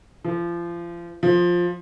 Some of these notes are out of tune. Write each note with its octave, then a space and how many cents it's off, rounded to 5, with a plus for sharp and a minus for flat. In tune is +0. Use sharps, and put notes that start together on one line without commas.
F3 -30
F3 +10